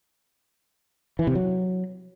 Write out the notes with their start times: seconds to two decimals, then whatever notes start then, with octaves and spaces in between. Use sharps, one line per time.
1.19 E3
1.27 C3
1.35 F#3